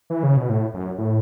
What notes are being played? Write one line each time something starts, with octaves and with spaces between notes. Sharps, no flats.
E3
C#3
B2
A2
F#2
A2